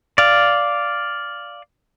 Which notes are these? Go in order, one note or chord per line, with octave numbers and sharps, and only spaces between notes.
D5 F5